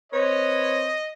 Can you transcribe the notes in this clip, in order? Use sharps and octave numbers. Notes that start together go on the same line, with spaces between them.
C4 B4 C#5 D#5